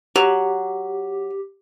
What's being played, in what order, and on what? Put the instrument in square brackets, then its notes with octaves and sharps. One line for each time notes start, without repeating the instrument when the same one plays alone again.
[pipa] F#3 [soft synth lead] G4